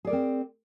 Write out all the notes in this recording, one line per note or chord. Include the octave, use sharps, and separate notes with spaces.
C4 G#4 A#4 D5